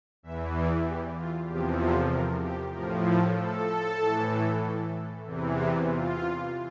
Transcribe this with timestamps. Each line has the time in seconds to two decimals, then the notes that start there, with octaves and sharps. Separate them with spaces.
0.23 E2 E3 E5
0.54 D5
0.85 G4
1.18 F4
1.48 E2 C3 F3 G4
1.80 A4
2.11 A#4
2.42 G4
2.73 A2 F3 A#4
3.05 A4
3.36 A4
4.00 A2 E3
5.25 E2 C3 E3
5.87 F4